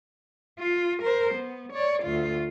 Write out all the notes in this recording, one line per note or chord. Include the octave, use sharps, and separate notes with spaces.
F4
A#4 C5
B3
C#5 D5
D2 F4